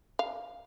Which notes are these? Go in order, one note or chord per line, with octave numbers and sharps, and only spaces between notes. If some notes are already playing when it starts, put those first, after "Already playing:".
F5